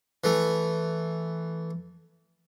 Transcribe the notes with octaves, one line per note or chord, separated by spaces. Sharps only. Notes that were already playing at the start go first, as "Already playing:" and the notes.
E3 A3